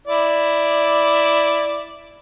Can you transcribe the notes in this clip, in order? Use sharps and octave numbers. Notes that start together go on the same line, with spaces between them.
E4 D5